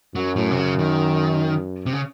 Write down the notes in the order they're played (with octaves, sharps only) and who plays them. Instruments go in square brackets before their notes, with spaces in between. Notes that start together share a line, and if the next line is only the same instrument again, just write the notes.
[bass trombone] F#2 [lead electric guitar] F#3
[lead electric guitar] A2
C3
C#3
D#3
C3
C#3